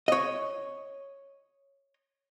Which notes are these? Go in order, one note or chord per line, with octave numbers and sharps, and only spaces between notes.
C#5 D#5